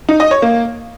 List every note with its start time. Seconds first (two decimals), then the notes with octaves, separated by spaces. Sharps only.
0.09 D#4
0.20 D#5
0.31 C#5
0.42 A#3